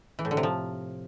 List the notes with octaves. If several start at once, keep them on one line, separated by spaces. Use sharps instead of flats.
E3
A2
D3
C3
F3